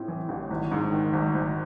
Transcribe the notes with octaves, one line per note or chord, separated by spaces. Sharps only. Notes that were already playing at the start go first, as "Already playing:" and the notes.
Already playing: A2 C4
E3
A1
G#1
G#2
D#3
G#1
G#1